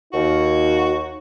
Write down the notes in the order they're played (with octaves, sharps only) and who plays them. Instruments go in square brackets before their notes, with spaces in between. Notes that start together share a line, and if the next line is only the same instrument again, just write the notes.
[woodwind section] D#2 [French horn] D#4 [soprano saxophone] F#4